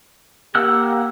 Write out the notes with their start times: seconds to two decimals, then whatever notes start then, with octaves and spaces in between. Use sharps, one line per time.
0.55 A#3 G4 F#5 E6 F#6